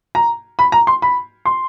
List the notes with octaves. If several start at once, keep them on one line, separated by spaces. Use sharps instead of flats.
A#5
B5
A#5
C6
B5
C6